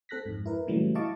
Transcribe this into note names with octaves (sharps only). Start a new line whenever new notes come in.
C4 A4 F#6 A#6 B6
F2 G#2
E4 A#4 B4
A#2 C#3 E3 F#3 G3 A3
E4 D#5 F5 A5 C#6 D6